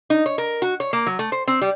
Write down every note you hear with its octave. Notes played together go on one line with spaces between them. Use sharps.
D#4
C#5
A#4
F#4
C#5
A#3
F#3
A3
C5
C4
G3